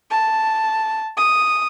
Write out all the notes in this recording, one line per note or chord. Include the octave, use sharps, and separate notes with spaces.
A5
D#6